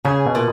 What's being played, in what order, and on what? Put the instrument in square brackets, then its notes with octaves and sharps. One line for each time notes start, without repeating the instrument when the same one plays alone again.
[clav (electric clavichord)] C#3 [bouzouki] G#4
[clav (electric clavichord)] B2
[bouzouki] A#2